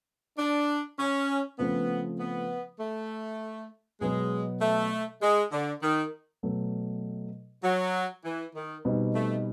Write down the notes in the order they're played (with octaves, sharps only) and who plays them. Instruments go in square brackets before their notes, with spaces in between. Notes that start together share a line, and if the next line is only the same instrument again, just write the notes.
[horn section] D4
C#4
[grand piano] C#3 F3 A3 C4 [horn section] B3
[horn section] B3
A3
[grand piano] B2 F#3 B3 [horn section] G#3
[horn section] A3
G#3
D3
D#3
[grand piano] B2 F#3 A3
[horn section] F#3
E3
D#3
[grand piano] B2 G3 C4 D#4
[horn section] A3